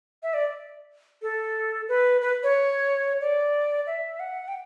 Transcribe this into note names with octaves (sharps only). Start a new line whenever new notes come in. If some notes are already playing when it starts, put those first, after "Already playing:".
E5
D5
A4
B4
B4
C#5
D5
E5
F#5
G5